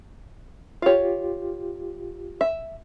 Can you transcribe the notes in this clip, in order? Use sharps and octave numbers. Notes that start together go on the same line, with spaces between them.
F4 G4 C#5 F5
E5